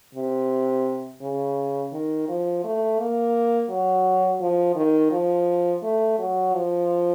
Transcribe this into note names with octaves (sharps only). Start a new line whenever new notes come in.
C3
C#3
D#3
F3
A3
A#3
F#3
F3
D#3
F3
A3
F#3
F3